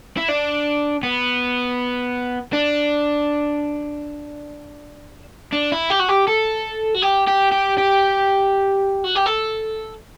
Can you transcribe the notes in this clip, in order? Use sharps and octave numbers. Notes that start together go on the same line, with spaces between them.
E4
D4
B3
D4
D4
E4
G4
F#4
G4
A4
F#4
G4
G4
G4
G4
F#4
G4
A4